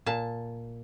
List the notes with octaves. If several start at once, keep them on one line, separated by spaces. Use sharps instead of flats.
A#2 A5